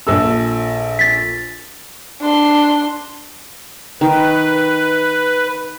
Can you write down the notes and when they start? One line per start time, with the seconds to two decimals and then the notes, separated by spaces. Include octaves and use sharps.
0.07 A#1 A4 E6
0.99 A6 B6
2.21 D4 C6
4.01 D#3 B4